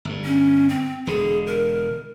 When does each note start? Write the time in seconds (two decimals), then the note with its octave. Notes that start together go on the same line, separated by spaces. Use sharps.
0.05 G1 G2
0.25 C#4
0.69 C4
1.07 E1 D3 G#4
1.47 A#4